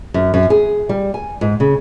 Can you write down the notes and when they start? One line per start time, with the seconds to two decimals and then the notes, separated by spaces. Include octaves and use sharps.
0.14 F#2
0.34 F#2
0.50 G#4
0.89 G3
1.14 G#5
1.41 G#2
1.60 C#3